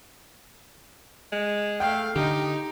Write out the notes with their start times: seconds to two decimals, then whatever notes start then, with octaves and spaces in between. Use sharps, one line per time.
1.32 G#3
1.80 A3 F5 G5
2.16 D3 D#4 G4